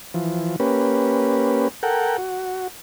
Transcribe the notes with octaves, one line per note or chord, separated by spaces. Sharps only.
E3 F3
A#3 C#4 G4 B4
A4 A#4 F#5 G5
F#4